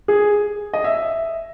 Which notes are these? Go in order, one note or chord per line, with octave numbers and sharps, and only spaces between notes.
G#4
D#5
E5